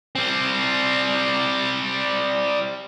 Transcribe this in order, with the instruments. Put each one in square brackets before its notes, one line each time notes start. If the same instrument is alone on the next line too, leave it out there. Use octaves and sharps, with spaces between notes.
[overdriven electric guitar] G3 C4